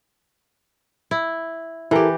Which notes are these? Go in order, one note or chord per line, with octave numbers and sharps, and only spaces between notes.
E4
E3 E4 G4 A4 A#4